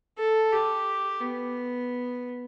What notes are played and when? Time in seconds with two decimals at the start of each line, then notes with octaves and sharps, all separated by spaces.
0.18 A4
0.53 G4
1.21 B3